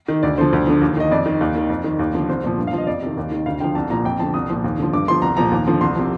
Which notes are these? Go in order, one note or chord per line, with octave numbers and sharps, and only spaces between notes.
D#3
D2 D5
D3 F3 C5
D2
D3 F3
D#2
D#3 D#5
F2 D5
D#3
D#2
D#3
F2
D#3
D#2
D3 F3
C2 C5
A#2 F3
G2
F5
F3
D#5
F2 D5
C3 D#3
D#2
D#3
D2 F5
D3 F3 G5
C2 A5
A#2 F3 A#5
F2 G5
D3 F3 A5
C2 D#6
A#2 F3
D#2
D3 F3
G2 D6
D3 F3 C6
C2 A#5
A#2 F3 A#5
D#2
D3 F3
C2 C6
C3 F3